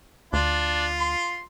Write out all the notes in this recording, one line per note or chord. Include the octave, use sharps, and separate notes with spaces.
D2 D4 F4
C6